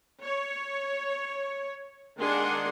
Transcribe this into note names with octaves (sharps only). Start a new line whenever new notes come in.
C#5
D#3 G#3 D4 G#4 F#5 C6